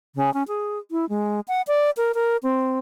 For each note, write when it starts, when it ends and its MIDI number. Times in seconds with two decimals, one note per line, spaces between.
0.15 0.33 49
0.34 0.43 61
0.48 0.78 68
0.91 1.08 64
1.09 1.40 56
1.48 1.62 78
1.67 1.90 74
1.97 2.12 70
2.14 2.37 70
2.43 2.79 60